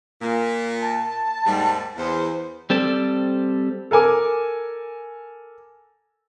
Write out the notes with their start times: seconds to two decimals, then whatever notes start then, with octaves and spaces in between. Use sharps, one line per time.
0.22 A#2
0.81 A5
1.46 D#2 G#2 G3
1.97 E2 C5
2.70 G3 C4 A4 D5
3.91 A4 A#4 G#5 D6